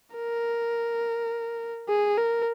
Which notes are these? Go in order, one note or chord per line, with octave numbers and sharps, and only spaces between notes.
A#4
G#4
A#4